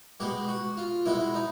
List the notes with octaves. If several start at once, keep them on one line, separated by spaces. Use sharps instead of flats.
B2 G#3 B3 G4
F#4
F4
B2 G#3 B3 E4
D#4